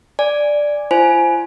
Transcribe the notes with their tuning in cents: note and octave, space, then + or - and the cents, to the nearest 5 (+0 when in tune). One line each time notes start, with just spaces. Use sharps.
D5 +0 G#5 -15
F4 -40 C5 +0 G#5 +15